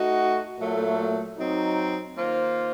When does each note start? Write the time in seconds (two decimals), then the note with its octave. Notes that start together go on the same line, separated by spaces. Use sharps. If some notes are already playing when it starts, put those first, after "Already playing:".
Already playing: A3 D#4 F#4
0.59 A#2 F#3 A3
1.38 F#3 C4 D#4
2.16 D#3 A#3 F4 C5